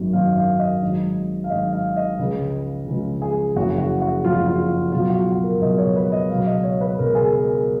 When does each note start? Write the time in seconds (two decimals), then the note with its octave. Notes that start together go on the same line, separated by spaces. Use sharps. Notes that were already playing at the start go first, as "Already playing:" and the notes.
Already playing: G#1 F#2 D#3 F#3
0.13 G#1 F#2 D#3 F#3 F5
0.36 F5
0.59 D#5
0.82 G#1 G#2 F#3
1.44 F5
1.50 G#1 G#2 F#3 D#5
1.73 F5
1.96 D#5
2.19 C#2 C#3 F3 G#3
2.87 C#2 C#3 F3 G#3
3.22 G#4
3.56 F#1 F2 C#3 F#4
3.78 F#4
4.02 F#4
4.24 F#1 F2 C#3 F4
4.48 F4
4.92 C#2 B2 F#3 F4
5.10 F#4
5.27 F#4
5.43 A#4
5.61 C#2 B2 F#3 D#5
5.78 C#5
5.96 B4
6.12 D#5
6.30 C#2 B2 F#3 F5
6.46 D#5
6.64 C#5
6.81 B4
6.97 C#2 B2 F#3 A#4
7.15 G#4
7.32 A#4
7.49 G#4